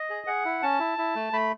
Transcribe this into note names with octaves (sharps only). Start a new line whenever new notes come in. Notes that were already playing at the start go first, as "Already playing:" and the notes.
Already playing: D#5
G#4
G#4 F#5
E4
C#4 A5
E4
E4
A3
A3 B5